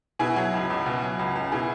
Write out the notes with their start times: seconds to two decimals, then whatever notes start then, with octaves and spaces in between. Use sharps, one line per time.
0.19 B2 E4 G#4
0.36 F#3
0.53 C#2
0.70 C#2
0.86 B2
1.02 F#3
1.19 C#2
1.35 C#2
1.52 B2 E4 G#4